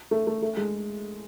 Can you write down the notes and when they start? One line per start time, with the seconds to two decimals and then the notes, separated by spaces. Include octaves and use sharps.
0.11 A3
0.27 A3
0.42 A3
0.57 G#3